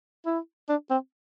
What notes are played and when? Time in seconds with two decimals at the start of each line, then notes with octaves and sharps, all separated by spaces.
0.26 E4
0.69 D4
0.91 C4